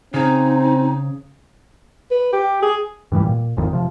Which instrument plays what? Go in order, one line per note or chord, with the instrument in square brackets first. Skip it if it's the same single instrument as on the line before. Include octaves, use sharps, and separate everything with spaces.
[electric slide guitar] C#3 G#4 [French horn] C4 [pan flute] D#4
[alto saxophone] B4
G4
G#4
[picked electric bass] G2 E3 F#3 G3
A#2
G#1 F2 D#3
C3 F3